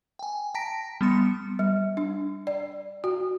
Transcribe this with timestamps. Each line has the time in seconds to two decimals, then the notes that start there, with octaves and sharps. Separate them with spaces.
0.19 G5 G#5
0.54 G5 A5 A#5 A#6 B6 D7
1.01 G3 B3 C6 C#7
1.59 G3
1.97 D4
2.47 D5
3.04 F#4